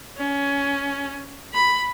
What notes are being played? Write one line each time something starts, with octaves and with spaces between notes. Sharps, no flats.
C#4
B5